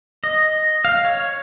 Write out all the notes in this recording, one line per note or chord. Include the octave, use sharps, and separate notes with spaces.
D#5
F5
C#5